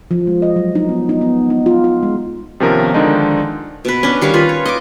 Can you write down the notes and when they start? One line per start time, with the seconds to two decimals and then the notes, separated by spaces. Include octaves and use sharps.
0.11 F3
0.27 G#3
0.42 D#5
0.56 F#3
0.75 D#4
0.89 B3
1.09 D#4
1.21 B3
1.50 D#4
1.66 F4
1.84 F4
2.03 G#3
2.60 C3 D#3 F3 B3 C#4 A#4
2.94 D3 D#3 F3 G#3 D4 D#4
3.85 B2 B4
4.03 C#4 D4
4.21 D#3 G3 C#5 F5
4.34 F4 B4
4.49 C#5
4.66 D#5 G#5 D6